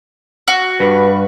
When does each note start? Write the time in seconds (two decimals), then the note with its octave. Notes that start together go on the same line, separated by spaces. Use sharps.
0.48 F#4
0.80 G2 B4